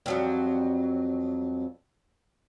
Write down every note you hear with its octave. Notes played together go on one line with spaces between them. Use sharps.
F2 F#3 G3